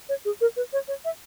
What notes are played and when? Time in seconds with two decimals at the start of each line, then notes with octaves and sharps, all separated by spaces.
0.09 C#5
0.25 G#4
0.41 A#4
0.57 B4
0.73 C#5
0.88 C#5
1.05 E5